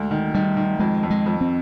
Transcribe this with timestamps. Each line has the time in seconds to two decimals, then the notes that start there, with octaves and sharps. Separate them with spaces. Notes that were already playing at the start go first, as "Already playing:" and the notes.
Already playing: D2 G#3
0.11 D#3
0.34 D#3 G3
0.57 D#3
0.79 F2 G#3
1.03 F2
1.10 G#3
1.26 F2
1.41 C4